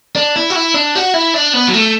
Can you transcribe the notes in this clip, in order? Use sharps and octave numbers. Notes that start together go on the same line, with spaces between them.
D4
E4
F#4
E4
D4
F#4
E4
D4
B3
F#3
A3